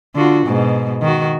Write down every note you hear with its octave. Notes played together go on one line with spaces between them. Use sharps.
D3 F4 F#4
G#2 B2
D#3 F#4